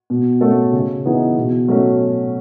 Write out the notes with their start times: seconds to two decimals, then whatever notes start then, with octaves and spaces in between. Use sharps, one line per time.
0.10 B2
0.41 A3 C#4 F#4 A4
0.73 C#3
1.05 E3 B3 D#4 G#4
1.37 B2
1.68 F#3 A3 C#4